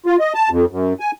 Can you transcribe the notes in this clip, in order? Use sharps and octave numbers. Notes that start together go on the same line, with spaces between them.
F4
D#5
A5
F2
F#2
G#5